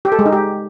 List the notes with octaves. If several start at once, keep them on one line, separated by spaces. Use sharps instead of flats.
G4
A4
G#3
D#4
G4